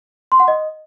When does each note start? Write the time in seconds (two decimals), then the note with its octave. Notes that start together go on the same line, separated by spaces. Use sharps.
0.32 C6
0.40 F#5
0.48 D#5